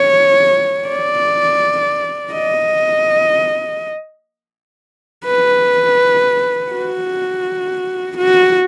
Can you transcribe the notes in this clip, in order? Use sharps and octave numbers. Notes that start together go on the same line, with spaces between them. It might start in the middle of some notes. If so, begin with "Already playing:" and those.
Already playing: C#5
D5
D#5
B4
F#4
F#4